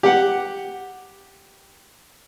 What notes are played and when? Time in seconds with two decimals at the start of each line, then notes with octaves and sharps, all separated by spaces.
0.03 G4 F#5